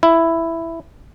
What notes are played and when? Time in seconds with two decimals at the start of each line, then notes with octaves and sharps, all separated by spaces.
0.03 E4